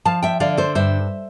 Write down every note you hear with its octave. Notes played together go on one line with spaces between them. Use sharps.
F3 F5 A5
E5 G5
D3 D5 F5
A4 C5
G2 C5 E5